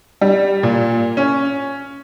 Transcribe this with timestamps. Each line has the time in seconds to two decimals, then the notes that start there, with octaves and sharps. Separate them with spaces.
0.21 G3
0.63 A#2
1.17 C#4